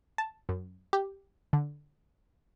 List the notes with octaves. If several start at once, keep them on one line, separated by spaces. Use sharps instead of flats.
A5
F#2
G4
D3